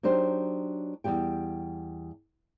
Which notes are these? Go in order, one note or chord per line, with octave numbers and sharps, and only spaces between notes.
F#3 D4 D#4 G4 C5
E2 G#2 G3 G4 G5